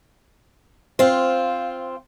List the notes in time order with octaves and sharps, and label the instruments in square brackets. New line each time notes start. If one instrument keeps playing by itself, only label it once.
[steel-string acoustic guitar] C4 F4 [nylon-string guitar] C5 [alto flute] F5